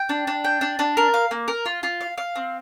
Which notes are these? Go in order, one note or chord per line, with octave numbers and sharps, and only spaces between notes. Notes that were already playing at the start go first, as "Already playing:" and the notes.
Already playing: G5
D4
D4
G5
D4
D4
A#4
F5
A#3
A#4
F4
F4
F5
F5
C4